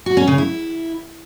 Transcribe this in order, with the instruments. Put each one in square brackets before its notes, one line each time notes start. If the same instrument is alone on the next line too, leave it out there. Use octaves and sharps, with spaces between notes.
[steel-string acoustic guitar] F#4
C#4
C#3
E4